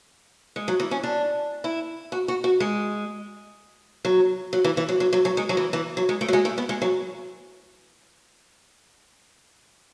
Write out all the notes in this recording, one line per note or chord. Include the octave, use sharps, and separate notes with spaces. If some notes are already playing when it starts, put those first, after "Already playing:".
G#3
F#3
E3
C#4
D4
E4
F#4
F#4
F#4
G#3
F#3
F#3
E3
E3
F#3
F#3
F#3
F#3
G#3
F#3
E3
E3
F#3
G#3
A3
F#3
G#3
A3
B3
G#3
F#3